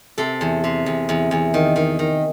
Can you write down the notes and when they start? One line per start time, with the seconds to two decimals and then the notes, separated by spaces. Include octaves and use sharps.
0.18 C3 A4
0.41 E2
0.64 C3
0.86 E2
1.09 E2
1.31 E2
1.54 D#3
1.76 D#3
1.99 D#3